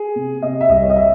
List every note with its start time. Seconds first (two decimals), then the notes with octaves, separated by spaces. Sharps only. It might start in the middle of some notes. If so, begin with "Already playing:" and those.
Already playing: G#4
0.16 C3
0.42 C3 D#5
0.61 E5
0.69 C2 D#5
0.82 C#5
0.90 D#5
0.96 E5